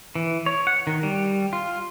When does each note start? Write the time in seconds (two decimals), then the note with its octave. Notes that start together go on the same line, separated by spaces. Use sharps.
0.15 E3
0.46 C#5
0.67 F#5
0.87 D#3
1.03 G3
1.53 F4